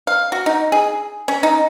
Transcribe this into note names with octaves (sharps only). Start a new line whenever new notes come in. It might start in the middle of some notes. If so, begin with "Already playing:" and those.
F5
F#4
D#4
G#4
C#4
D#4